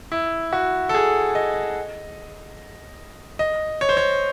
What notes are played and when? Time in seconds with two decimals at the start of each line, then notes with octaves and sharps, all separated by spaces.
0.12 E4
0.53 F#4
0.89 A4
0.95 G#4
1.35 D#5
3.39 D#5
3.81 C#5
3.89 C5
3.97 C#5